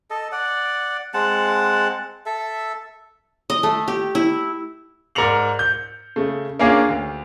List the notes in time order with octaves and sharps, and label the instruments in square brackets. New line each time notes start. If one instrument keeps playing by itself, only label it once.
[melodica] A4 D#5
D5 F#5
G#3 C4 F#5 A5
A4 E5
[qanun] D#5
A3
G4
E4
[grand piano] G#2 A#4 D5 C#7 F7 F#7
G6
C#3 A3
A#3 C#4 D4 F4 G#4
D2